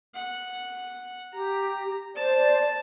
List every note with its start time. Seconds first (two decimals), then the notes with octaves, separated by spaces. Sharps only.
0.15 F#5
1.34 G4 A#5
2.16 C5 D5 A5